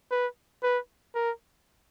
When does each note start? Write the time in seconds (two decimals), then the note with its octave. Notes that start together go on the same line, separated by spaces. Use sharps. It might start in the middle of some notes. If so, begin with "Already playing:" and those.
0.11 B4
0.63 B4
1.15 A#4